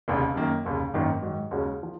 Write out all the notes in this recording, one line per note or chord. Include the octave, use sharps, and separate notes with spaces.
F1 D#2 C#3
F#2 D#3 A#3
F1 D#2 C#3
G#1 F#2 D#3 A#3
G#2 D#3 F#3
D#2 C#3 G#3 C#4 F#4
F3